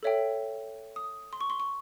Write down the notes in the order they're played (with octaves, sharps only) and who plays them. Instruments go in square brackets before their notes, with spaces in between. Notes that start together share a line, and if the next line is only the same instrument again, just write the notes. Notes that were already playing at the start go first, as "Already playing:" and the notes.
[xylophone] A4 C#5 E5 G5
D#6
C6
C#6
C6
C#6